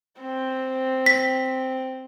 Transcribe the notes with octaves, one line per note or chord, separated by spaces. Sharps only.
C4
B6